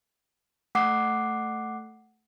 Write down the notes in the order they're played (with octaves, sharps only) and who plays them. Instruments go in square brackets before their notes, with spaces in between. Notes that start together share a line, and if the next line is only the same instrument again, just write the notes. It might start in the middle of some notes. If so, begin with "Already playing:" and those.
[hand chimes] A3 F#5 D6 C7